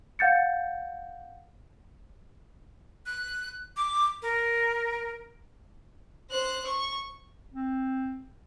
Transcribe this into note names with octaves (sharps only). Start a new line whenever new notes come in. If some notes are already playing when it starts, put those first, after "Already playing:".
F5 F#5 G6 A6 C#7
F#6
D6
A#4
C5 F#6
C#6
C4